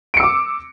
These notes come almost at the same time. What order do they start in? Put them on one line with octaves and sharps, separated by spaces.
D7 C#7 E6 D6